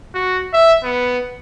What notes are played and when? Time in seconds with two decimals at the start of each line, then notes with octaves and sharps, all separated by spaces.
0.14 F#4
0.53 E5
0.84 B3